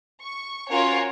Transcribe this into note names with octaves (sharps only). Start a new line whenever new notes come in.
C#6
C#4 F4 F#4 A#4 C#5